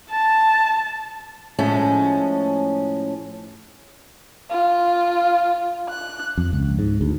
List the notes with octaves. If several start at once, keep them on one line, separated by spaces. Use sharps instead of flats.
A5
A2 F3 G#3 C#4
F4
F#6
F2
C#2
G#2
D2